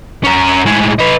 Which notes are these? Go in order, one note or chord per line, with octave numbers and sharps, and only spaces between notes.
C#4 A#4
A2 G#3
D#4 B4